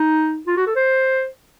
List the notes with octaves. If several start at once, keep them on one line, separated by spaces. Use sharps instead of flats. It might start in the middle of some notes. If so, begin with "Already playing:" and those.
Already playing: D#4
F4
F#4
A4
C5